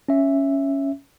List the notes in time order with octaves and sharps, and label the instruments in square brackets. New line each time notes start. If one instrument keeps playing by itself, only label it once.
[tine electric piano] C#4 E5